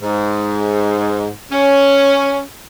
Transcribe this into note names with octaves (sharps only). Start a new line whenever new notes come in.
G#2
C#4